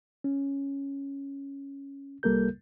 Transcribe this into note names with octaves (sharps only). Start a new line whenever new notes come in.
C#4
C2 G3 A#3 A4 A#4 G6